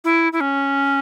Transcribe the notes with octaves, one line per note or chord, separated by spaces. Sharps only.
E4
E4
C#4